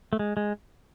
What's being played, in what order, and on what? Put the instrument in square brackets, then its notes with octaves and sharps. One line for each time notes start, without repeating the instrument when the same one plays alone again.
[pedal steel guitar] A3
G#3
G#3